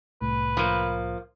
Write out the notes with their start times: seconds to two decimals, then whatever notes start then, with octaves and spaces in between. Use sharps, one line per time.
0.21 C2 A2 B4
0.57 F3 A#3